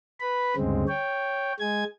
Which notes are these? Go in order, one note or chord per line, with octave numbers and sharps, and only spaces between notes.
B4 B5
D2 G2 C#3 G#3 C4
C#5 G5
G#3 G#5 G#6